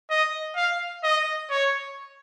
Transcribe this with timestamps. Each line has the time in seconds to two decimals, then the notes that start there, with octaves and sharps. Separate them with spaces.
0.10 D#5
0.56 F5
1.03 D#5
1.50 C#5